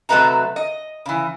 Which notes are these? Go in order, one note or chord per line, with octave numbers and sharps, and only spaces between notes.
C3 F#3 A3 B4 D#5 A#5
D#5
C#3 E3